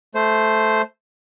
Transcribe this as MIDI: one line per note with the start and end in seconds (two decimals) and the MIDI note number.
0.15 0.82 57
0.15 0.82 72